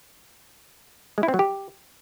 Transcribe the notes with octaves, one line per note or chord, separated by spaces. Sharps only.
G#3
E4
C4
F#3
G4